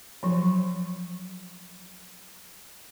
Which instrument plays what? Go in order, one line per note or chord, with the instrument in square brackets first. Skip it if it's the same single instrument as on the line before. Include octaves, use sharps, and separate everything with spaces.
[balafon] F3 F#3